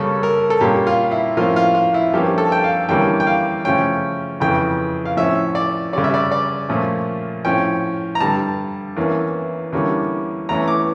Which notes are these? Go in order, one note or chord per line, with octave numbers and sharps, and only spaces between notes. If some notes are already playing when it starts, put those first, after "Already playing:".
Already playing: C#3 G3 A#3 C#4 A4
A#4
A4
A#2 G3 A#3 C#4 G4
F4
E4
A2 F3 A#3 C#4 F4
F4
F4
E4
G2 F3 A#3 C#4 G4
A4
G5
F5
E2 D3 G3 A#3 C#4 G5
G5
F5
C#3 F3 A3 C#4 G5
F2 C#3 E3 G5
F5
A2 F3 C#4 E5
D5
C#3 G3 C#4 D5
E5
D5
D5
A#2 F3 A3 C#4
A2 F3 C#4 G5
A#5
G2 D3 G3 A5
E2 E3 A#3 C#4
E2 D3 G3 A#3 C#4
E2 E3 A3 C#4 A#5
D6